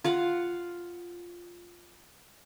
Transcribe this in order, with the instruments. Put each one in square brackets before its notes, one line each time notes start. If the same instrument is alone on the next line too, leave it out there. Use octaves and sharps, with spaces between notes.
[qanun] F4 F5 F#5